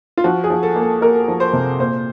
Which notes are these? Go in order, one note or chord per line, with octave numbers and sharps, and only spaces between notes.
F4
F3 F#4
G#4
F3
A4
A#3
A4
A#3 A#4
F3
C5
C3
A#2 C5